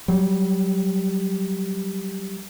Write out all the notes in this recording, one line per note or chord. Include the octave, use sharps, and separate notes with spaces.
F#3 G3